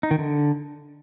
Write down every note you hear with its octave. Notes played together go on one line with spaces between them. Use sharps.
D#4
D#3
D3